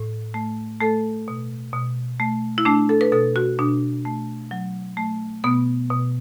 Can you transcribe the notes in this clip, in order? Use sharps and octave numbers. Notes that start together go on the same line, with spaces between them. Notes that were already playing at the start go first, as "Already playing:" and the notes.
Already playing: A2
A3
A3 A4
B2
B2
A3
E4
A3 D4
A4
B4
B2 A4
F#4
B2 D4
A3
F#3
A3
B2 B3
B2